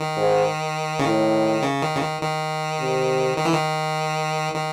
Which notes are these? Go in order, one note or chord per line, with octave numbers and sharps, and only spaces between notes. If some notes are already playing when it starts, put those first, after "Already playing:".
Already playing: D#3
G#2
C#3
A2 D#3
C#3
D#3
C#3
D#3
D#3
C3
D#3
E3
D#3
D#3